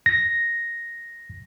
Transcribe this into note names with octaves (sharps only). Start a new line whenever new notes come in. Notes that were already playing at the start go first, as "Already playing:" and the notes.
A#6